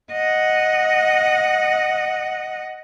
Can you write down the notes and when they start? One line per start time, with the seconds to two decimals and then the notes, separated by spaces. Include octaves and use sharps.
0.12 D#5 F#5